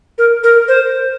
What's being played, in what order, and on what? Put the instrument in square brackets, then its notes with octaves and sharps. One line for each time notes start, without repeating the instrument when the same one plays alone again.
[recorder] A#4
A#4
C5